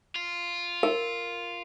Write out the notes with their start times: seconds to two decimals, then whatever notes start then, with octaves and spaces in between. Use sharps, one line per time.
0.16 F4
0.83 A#4